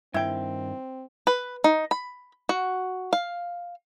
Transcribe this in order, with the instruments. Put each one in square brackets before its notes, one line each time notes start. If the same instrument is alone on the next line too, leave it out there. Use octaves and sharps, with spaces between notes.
[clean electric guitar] G2 D#3 [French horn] C4 [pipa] E4 G5
[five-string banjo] B4
D#4
B5
F#4
F5